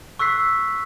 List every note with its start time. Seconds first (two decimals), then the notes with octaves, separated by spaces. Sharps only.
0.19 C#6 E6 F#6 B6 C7